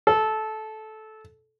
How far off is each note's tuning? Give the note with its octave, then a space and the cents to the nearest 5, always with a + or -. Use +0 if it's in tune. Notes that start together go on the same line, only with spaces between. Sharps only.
A4 -15